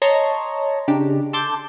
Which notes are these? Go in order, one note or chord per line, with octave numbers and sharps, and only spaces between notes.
C#5 D#5 A5 A#5 C6 C#6
C#3 D4 D#4 G4
A4 A5 C6 D6 G6